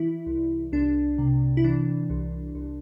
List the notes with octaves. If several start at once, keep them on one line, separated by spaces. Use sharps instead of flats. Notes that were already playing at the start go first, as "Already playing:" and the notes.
Already playing: E3 E4
C2
C2 D4
C3
E4
E3 D4
C2
C2